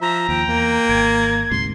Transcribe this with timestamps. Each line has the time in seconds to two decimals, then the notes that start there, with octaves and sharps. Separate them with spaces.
0.01 F3 E5 A#5
0.29 D#2 F3 G5
0.48 E2 A#3
0.89 G#1 G#6
1.51 D2 G#2 C3 C6